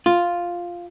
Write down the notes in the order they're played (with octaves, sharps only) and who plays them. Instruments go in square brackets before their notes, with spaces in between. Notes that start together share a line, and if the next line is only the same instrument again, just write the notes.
[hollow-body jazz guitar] F4